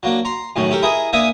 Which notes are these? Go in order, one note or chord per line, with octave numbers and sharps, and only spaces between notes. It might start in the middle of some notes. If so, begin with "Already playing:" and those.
F#3 A#3 D4
A#5 C6
F#2 A2 D#3 F#3
G4 A4 A#4
E4 G#4 A#4 D#5
A#3 D4 A#4 E5 G#5 D#6